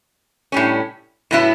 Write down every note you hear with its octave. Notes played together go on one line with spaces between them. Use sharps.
A2 G3 C#4
A2 F#3 B3 E4